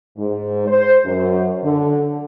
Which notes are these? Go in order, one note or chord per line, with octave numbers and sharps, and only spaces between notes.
G#2
C5
F#2
D3